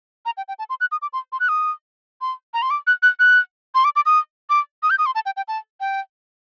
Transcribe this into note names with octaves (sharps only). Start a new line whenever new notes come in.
A#5
G5
G5
A5
C6
F#6
D#6
D6
C6
C6
F#6
D#6
C6
A#5
C6
D6
F#6
F#6
F#6
C6
D6
D6
D#6
D6
D#6
G6
D#6
C6
A5
G5
G5
A5
G5